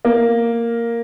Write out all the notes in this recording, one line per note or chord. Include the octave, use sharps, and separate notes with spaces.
A#3